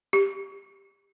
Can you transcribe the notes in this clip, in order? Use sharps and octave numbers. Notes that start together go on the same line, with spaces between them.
G4